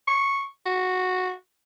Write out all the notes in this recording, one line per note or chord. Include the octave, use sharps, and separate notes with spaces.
C#6
F#4